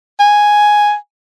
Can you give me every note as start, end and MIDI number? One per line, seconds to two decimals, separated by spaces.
0.20 0.95 80